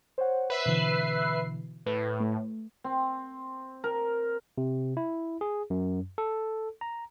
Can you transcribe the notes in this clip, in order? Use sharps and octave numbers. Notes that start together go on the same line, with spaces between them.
C5 C#5 F#5
B4 E5 C7
B2 D3 E3
A2 B4
A3
C4
A#4
C3
E4
G#4
F#2
A4
A#5